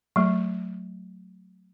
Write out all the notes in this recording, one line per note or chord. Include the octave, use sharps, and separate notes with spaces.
F#3 A3